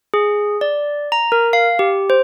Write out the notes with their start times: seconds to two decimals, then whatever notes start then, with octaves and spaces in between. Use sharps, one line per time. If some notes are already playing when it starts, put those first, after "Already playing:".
0.14 G#4
0.61 D5
1.12 A#5
1.32 A#4
1.53 F5
1.79 G4
2.10 C5